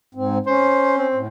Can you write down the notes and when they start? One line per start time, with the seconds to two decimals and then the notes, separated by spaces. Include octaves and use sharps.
0.15 G#2 C4
0.46 C#4 C5
0.98 C4
1.15 A2